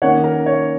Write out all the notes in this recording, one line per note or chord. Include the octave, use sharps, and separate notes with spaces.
D#3 A#3 C#4 C#5 F#5
A#4
C#5